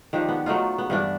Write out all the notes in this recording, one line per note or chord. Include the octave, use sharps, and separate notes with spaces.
D#3 F3 D4 G4
B3
F#3 A3 D#4 F4
B3
G2 E3 D4